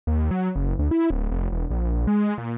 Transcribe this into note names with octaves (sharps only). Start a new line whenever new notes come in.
D#2
F#3
F#1
D2
E4
D1
F1
E1
A#1
G#3
A#2